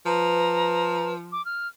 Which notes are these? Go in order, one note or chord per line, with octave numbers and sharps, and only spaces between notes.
F3 B4 A#5
D6
F6